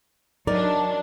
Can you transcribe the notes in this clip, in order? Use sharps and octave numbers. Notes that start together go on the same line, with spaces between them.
F#3 D4 D#4 A#4 D5